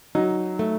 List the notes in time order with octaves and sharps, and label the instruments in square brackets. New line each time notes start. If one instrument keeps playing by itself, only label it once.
[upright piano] F#3 [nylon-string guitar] D#4
[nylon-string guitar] A3